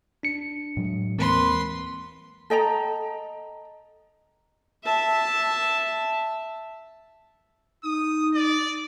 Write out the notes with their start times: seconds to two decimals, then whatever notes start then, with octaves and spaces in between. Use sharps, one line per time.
0.23 D4 C#7
0.77 A2 F#3 G#3
1.18 D#2 E3 G#3 A#3 C4 A#4 B4 C6
2.50 A4 D#5 G5 A#5
4.85 E5 A5
7.84 D#4 D#6
8.34 D5